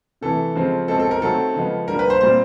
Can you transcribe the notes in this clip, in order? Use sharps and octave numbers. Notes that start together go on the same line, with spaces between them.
C3 E3 A3 A4
C#3 F3 G#3 C4
B2 G#3 C4 A4
A4
A#4
D#3 F#3 A3 C4 A4
C#3 F3 G#3 B3
D3 G3 A#3 A#4
B4
C5
A#2 G3 C4 C5